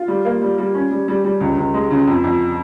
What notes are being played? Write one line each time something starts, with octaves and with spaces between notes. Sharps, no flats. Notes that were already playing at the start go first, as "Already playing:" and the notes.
Already playing: F4
G3
A#3
G3
G3
C#4
G3
G3
G3
C#2
C#2
G#3
C#3
F2
F2